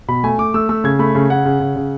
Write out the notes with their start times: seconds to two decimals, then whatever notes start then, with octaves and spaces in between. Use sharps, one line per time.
0.08 B2 B5
0.24 A3 G#5
0.39 A3 D6
0.54 A3 E6
0.69 A3 E6
0.84 C#3 G#6
0.99 A3 B5
1.15 C#3
1.30 C#3 F#5
1.45 C#3
1.60 C#3
1.76 C#3